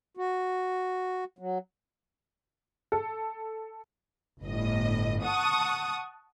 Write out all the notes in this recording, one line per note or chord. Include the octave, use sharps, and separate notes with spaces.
F#4
F#3
A4
G1 A2 D#5
F#5 A5 C#6 D#6